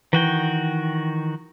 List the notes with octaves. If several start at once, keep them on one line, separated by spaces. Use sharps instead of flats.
D#3 E3 F#4 G5